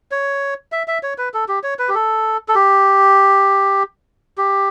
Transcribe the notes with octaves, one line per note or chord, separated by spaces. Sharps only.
C#5
E5
E5
C#5
B4
A4
G4
C#5
B4
G4
A4
A4
G4
G4